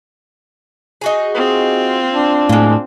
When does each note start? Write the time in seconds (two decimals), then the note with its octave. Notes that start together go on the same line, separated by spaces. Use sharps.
1.01 D#4 F#4 G#4
1.34 C4 F4
2.12 D4
2.49 A2 G#3 A#3